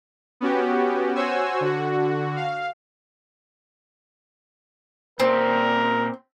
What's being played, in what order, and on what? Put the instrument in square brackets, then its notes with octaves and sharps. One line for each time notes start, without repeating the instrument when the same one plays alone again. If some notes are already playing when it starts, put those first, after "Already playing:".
[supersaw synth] B3 C#4 F#4 G4
F#4 C5 C#5 G#5 E6
D3 F#4
F5
[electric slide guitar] A#2 G4 [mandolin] C4 [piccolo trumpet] A#4